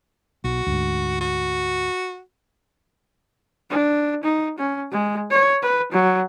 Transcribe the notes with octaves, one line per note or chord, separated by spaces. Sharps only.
B1 F#4
D2 G#2
F#4
D4
D#4
C#4
G#3
C#5
B4
F#3